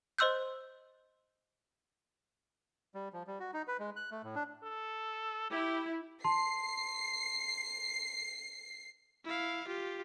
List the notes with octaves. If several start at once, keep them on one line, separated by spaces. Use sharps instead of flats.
C5 D#5 C6 E6 F#6 G6
G3
F3
G3
F#4
D#4
B4
G#3
F#6
A3
A2
D4
A4
E4 G4
A5 C6 C7
E4 F5
F4 G4